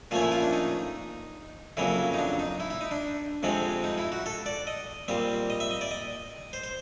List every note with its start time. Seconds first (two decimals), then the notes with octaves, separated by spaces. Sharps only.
0.11 A#2 F3 A3 C#4 F4
0.22 E4
0.32 F4
0.43 D4
0.53 D#4
1.77 F2 C#3 F#3 A#3 E4
2.13 D#4
2.18 D4
2.39 D#4
2.60 E4
2.70 E4
2.81 D#4
2.91 D4
3.43 F2 C3 F3 G#3 C4
3.84 D#4
3.98 E4
4.12 F#4
4.26 A4
4.46 D5
4.67 D#5
5.08 A#2 G3 C4
5.50 D#5
5.60 E5
5.71 D#5
5.81 D5
5.91 D#5
6.53 C5
6.64 C5